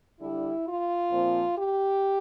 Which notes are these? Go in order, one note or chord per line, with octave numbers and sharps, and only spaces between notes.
D3 G3 D4 E4
F4
A#2 F3 C4
G4